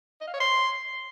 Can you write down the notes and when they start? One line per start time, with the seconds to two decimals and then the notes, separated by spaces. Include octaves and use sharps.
0.21 D#5
0.27 F5
0.34 C#5
0.40 C6